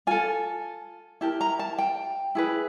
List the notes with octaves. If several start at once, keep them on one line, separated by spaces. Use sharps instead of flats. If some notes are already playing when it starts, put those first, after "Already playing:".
F4 A4 G#5
E4 G4 A#4 A5
A#5
A5
G5
E4 G#4 B4